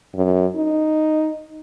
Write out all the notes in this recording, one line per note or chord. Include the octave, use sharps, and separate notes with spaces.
F#2
D#4